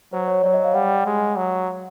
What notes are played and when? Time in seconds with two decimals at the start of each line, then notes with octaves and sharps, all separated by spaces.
0.13 F#3 C5
0.28 C#5
0.43 F#3 D5
0.54 D#5
0.65 F5
0.74 G3 F#5
1.06 G#3
1.36 F#3